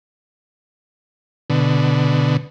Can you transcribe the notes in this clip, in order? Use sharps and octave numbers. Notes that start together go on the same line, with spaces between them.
B2 D3